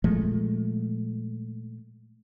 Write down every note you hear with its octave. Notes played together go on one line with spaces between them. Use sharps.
A#2 F3 G#3 A3